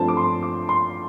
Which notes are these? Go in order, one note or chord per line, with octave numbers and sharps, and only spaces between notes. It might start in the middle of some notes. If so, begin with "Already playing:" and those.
Already playing: G2 F3 A3 C4 C5 A5
D6
C6
D6
C6